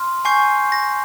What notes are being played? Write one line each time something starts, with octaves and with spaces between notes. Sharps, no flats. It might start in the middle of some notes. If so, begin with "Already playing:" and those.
Already playing: C6 F6
G#5 C#6 G6 C7
A#6